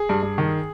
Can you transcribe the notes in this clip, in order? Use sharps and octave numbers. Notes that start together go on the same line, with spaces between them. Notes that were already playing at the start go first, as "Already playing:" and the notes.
Already playing: G#4
G2
G2
D#3